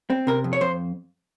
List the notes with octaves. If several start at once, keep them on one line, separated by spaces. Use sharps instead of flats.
C4
C3 A#4
F2
C#5
F2 C5